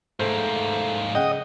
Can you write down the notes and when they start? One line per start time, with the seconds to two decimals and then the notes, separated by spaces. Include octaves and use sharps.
0.20 G#2 A3 A#3 C5
1.15 C#3 D#5 F#5 G5